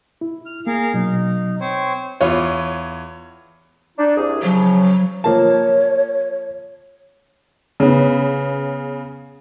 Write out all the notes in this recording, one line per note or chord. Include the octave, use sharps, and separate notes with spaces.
E4
F6
A#3 G#4 A#4 F5
B2 F#3 D#4
C4 C5 C#5
E2 F4 C#5
D4 D#4
C2 G#4
C#3 F3 F#3
F3 A#3 C#5 A5
C#3 B3